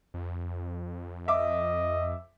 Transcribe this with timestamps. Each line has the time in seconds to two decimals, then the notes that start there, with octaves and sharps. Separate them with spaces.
0.14 F2
1.28 D#5 E5 D6